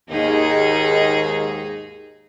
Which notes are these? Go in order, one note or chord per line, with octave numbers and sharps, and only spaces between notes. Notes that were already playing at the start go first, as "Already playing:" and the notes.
D#2 G#2 D#3 D#4 G#4